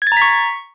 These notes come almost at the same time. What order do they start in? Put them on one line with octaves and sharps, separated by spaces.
G#6 A6 A#5 B6 C#6